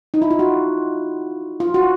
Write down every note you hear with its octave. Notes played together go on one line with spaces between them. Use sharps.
D#4
E4
F4
F#4
F4
F#4